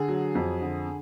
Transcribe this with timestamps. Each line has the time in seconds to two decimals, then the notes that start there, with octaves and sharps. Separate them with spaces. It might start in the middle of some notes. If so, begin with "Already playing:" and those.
Already playing: D3 G#4
0.08 F#3
0.35 F2
0.61 D3